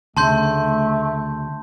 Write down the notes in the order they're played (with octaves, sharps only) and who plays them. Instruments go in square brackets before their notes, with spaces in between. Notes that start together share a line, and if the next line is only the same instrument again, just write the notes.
[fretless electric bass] D2 C#3 [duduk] A3 [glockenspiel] A5 C6 G6